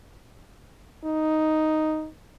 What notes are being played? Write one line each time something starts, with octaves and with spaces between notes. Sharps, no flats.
D#4